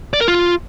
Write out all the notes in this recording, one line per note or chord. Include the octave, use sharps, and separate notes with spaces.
D5
A#4
F4